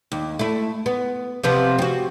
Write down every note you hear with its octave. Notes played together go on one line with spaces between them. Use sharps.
D#2
A3 E4
B3
C3 F3 B3
C4 F#4